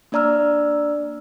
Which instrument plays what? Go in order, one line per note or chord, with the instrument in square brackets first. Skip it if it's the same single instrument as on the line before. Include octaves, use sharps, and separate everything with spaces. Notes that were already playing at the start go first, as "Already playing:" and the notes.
[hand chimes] A#3 D4 D5 A#5 E6 F6